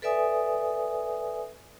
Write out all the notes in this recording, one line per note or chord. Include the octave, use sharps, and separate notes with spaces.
A4 B4 D5 E5 G#5 D#6